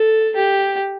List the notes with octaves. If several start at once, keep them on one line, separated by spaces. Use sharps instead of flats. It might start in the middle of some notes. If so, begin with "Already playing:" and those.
Already playing: A4
G4